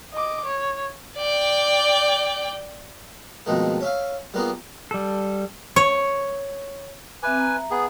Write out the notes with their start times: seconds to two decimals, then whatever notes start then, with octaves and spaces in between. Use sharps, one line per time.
0.13 D#5 D6
0.45 C#5
1.17 D5 G5
3.46 F2 B2 D#3 G#3 A3
3.81 C#4 E5 F5
4.34 G3 A#3 B3 F4 G#4
4.91 G3 A4
5.76 C#5
7.23 C4 B4 E5 G#5 D6
7.38 E5 A#5
7.71 B3 G#4